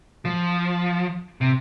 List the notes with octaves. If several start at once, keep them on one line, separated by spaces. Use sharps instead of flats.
F3
C3